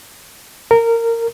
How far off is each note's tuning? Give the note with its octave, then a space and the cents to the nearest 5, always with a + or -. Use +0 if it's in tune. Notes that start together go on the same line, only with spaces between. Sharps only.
A#4 -20